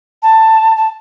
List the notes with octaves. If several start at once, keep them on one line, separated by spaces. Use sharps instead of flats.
A5
A5